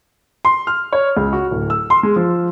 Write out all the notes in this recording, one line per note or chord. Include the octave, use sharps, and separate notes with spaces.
C6
F6
C#5
C#2
F#4
D1
E6
C6
G#3
F3